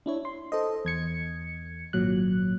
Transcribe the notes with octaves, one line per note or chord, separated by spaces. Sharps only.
D4 E4 C#5
C6
A4 C5 D#5
E2 G#6 C#7
G#1 A#2 F#3 F#6